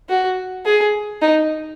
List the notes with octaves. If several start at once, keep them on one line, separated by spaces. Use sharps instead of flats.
F#4
G#4
D#4